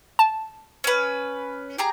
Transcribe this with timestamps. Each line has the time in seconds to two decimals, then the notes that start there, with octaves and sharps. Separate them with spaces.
0.19 A5
0.84 C#4 B4
1.78 G4 G#4 A#5